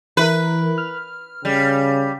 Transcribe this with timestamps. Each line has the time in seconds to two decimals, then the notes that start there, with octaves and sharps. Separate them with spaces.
0.17 E3 E4 A#4 B4
0.78 F6
1.45 C#3 G3